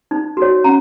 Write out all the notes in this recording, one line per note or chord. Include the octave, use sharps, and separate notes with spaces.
D#4
F#4 C#5
C#4 A#5